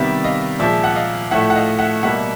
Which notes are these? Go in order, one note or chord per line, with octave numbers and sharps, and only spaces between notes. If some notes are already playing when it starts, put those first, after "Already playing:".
Already playing: C3 D#3 G3 B3 D5 E5
D#5 F5
A#2 F3 G#3 D5 E5
F#5
D#5 F5
A2 F3 A3 E5 F#5
F#5
D#5 F5
E5 F#5
B2 G3 A#3 E5 F#5